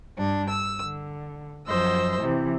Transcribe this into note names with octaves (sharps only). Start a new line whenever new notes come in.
G2 D4
E6
D3
F#2 F3 C5 D#5 E6
C3 E3